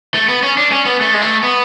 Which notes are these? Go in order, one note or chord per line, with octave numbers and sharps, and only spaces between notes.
A3
B3
C#4
D4
C#4
B3
A3
G#3
A3
B3